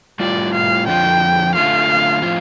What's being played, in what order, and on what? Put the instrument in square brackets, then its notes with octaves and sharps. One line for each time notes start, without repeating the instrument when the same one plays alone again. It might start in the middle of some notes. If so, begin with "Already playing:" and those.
[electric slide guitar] A2 G3 F4 [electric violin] D5
[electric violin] F5
[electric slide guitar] F2 D3 F3 [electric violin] G5
[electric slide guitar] D3 A3 F4 [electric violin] F5
[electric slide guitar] A2 F3 C4 F4